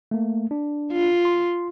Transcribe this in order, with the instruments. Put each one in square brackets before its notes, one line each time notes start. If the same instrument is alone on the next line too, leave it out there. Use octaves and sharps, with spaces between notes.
[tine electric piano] A3 A#3
D4
[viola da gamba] F4
[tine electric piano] C6